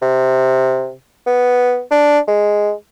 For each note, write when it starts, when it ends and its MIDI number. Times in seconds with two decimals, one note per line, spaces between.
0.02 0.92 48
1.26 1.81 59
1.91 2.19 62
2.28 2.72 56